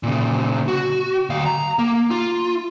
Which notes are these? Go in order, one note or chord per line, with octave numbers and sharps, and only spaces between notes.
A#2 C#3
F#4
D2 F5
A#5
A#3
F4